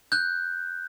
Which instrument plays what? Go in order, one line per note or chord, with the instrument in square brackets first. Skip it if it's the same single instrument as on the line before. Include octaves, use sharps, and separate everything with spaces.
[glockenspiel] F#6 G6